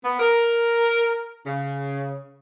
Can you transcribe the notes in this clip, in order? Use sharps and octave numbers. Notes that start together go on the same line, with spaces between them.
B3
A#4
C#3